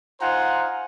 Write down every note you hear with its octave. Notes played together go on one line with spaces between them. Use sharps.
D#4 F4 C5 F#5 G#5 A#5